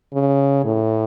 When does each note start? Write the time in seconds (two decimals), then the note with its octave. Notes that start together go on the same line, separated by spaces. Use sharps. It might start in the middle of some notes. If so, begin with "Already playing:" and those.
0.14 C#3
0.65 A2